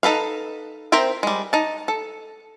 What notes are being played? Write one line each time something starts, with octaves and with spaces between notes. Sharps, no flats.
D#4 A4 B4 F5
C4 A#4 C5 E5 G5
G3 G#3
D#4 A5
A4